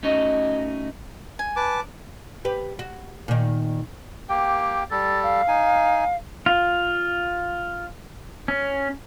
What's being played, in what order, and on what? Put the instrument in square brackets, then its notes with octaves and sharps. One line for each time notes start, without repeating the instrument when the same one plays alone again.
[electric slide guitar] A3 C#4 D#4 F#4 D#5
[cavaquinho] G#5
[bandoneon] B4 A5 D6
[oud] G4 B4
F#4
A#2 D#3
[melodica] A#3 G4 G5
[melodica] G3 A4 [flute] A6
[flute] F5
[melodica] D#4 G#5
[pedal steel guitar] F4
C#4